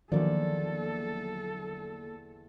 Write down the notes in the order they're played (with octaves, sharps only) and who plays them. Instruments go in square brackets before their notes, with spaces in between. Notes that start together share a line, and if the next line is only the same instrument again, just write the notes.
[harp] E2 D5 [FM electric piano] D3 F#3 A#3 [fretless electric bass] D#3 F3 [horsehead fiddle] A4